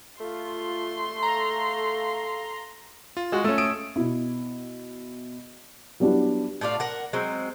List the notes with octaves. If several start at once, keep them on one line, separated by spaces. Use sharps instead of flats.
A3 F4 C6
A4 F5 A#5
F4
G#3 F#4
A3 C#4
D#6 E6 D7
B2 E4
F#3 G3 B3 D4 E4
A2 F4 D5 F5
A#4 F#5
F#3 G#3 C4